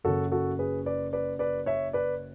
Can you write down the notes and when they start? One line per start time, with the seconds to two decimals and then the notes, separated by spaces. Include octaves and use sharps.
0.04 F#1 F#2 C#3 F#4 A4
0.32 F#4 A4
0.59 G#4 B4
0.86 B4 D5
1.13 B4 D5
1.39 B4 D5
1.66 C#5 E5
1.93 B4 D5